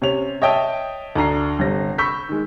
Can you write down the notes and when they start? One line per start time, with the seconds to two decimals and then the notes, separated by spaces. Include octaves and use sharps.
0.02 C3 C#4 C#5 F7
0.42 C#5 D#5 E5 G5 A5 D#6
1.15 D2 D4 A#5 C7
1.59 G1 C3 A#6
1.98 B5 C#6 E6 G6 B6
2.29 D#3 G#3